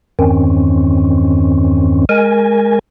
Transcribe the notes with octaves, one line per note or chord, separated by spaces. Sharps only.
E2 G2 D#3 C4 C#4
G#3 A#4 G#5